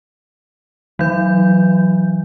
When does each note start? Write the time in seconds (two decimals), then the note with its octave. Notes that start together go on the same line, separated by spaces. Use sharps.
0.99 E3 F#3 G6